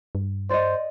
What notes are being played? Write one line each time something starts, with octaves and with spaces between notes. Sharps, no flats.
G2
C5 D5 D#5